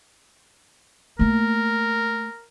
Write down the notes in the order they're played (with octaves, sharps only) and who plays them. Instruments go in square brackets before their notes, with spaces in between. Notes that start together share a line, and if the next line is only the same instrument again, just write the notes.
[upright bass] A3 A#3 [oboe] A#4